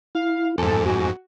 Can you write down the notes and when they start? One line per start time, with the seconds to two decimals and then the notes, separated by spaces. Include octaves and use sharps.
0.15 E4 F5
0.58 F2 G#2 A4 G#5 D6
0.86 F#4